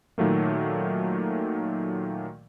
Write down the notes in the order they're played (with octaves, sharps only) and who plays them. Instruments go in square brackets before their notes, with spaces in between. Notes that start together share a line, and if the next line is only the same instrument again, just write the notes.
[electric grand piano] A#2 D#3 F#3 A3 A#3